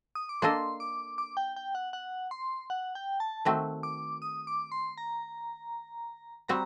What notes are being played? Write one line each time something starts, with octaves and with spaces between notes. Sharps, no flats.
D#6
D6
A#3 D4 A4 D#5 C6
D6
D6
G5
G5
F#5
F#5
C6
F#5
G5
A5
D#3 A3 C4 F#4
D6
D#6
D6
C6
A#5
G3 C4 F#4 A#5